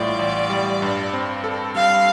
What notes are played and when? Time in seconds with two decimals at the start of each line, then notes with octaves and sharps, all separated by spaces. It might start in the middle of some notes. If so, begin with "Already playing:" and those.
Already playing: A1 A2 G3 F4 D5
0.19 A1
0.50 G3
0.82 G2
1.13 C4
1.44 A4
1.75 G3 F5